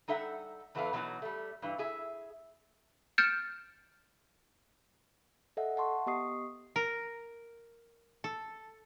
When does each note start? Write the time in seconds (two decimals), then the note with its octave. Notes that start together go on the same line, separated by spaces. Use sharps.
0.08 G3 D#4 A4 E5 F#5
0.75 E2 E3 A3 B3 F4 F5
0.93 B2 E3 F#3 C#4 D#4 F#4
1.22 G3 A3
1.62 G2 E3
1.78 E4 G#4 E5
3.18 F6 G6 A6 C#7 D7 E7
5.57 A4 D#5 E5 F#5
5.77 F#5 A5 C6 C#6
6.07 B3 G4 D#5 C#6 D#6 C7
6.76 A#4
8.24 A4